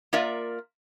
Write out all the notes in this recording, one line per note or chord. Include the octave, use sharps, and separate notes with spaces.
A#3 F4 A#4 D5 E5